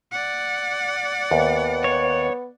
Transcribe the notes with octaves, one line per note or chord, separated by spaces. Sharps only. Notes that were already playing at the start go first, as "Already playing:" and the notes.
D5 F#5
D#2 B3
C#5